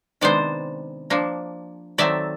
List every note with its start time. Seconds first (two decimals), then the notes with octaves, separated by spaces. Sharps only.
0.21 C3 D#3 G#3 B3 D4 C5 D5
1.10 F3 A#3 D4
1.98 D#3 F#3 A3 C4 D5 E5